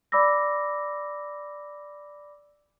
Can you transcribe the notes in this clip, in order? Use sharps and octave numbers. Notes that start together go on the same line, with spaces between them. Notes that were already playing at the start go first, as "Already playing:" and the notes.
D5 B5 D6 E6 A#6